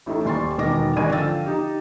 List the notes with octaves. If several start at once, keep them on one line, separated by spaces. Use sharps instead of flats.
A1 A2 D#4 A4
D#1 G3 C6 C#6 A6
E1 B2 D#3 D#5 D6 A#6
G#1 G3 D4 D#5 G#5 D#7
D3 F3 F5 G5 E6 A6
D#4 G4